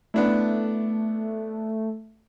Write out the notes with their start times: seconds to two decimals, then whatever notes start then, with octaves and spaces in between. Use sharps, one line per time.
0.14 A3 B3 D4 E4